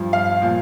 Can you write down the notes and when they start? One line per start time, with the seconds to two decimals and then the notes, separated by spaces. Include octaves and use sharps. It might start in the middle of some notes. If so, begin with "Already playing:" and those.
Already playing: G2 F3
0.13 F5
0.42 A#2 F3